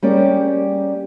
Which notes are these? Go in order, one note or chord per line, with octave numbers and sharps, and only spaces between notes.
G3 A#3 C#4 G4 G#4 D5